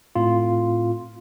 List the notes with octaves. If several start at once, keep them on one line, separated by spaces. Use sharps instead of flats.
A2 C4 F4